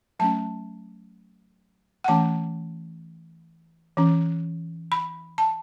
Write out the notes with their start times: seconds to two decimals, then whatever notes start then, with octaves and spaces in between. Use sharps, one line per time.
0.19 F#3 A3 C#4 A5
2.04 F#5
2.08 E3 A3 C#4 A5
3.97 E3 C#4
4.92 B5
5.38 A5